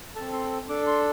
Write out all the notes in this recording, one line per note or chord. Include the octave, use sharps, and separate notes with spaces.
C4 A4 A5
C6
D4 A4 D6
C6